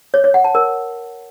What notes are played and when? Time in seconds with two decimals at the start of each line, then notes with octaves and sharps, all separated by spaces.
0.14 C#5
0.24 C#5
0.34 F#5
0.44 A5
0.55 A#4